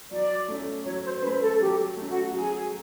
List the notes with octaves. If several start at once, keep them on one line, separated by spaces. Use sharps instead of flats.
F#3 D5
A3 C#4
F#3 C#5
C5
C5
A3 C#4 B4
A4
F#3 G4
A3
C#4
F#4
F#3 G#4